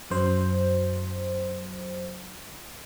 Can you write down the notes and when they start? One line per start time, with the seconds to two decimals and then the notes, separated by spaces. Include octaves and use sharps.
0.10 F#2 F#3 C5